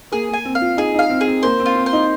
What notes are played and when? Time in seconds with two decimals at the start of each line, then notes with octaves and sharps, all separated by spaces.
0.12 A#3 G#4
0.29 A#3 G#5
0.45 C4
0.55 F5
0.61 F4
0.77 D#4 G#4
0.94 D#4 F5
1.10 C4
1.21 G#4
1.27 C4
1.43 A#3 C5
1.60 C4
1.66 F4
1.75 C4
1.86 C5
1.93 D#4